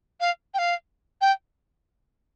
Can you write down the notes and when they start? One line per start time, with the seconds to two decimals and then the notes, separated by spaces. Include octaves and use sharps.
0.20 F5
0.54 G5
0.59 F5
1.21 G5